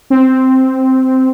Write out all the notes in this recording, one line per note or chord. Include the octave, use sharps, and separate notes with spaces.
C4